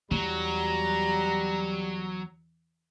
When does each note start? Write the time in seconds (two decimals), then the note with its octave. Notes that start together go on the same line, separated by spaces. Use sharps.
0.11 E2 F#3 G3 A#5